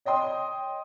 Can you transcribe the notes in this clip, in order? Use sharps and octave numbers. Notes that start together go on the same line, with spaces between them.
C#5 D#5 G5 C6 D#6